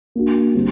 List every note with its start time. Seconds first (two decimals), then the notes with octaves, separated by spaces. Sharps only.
0.15 A#3 D4 F#4
0.54 D3 G3 C4